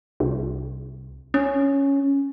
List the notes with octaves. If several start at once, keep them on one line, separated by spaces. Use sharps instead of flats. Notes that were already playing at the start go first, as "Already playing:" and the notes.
C2
C#4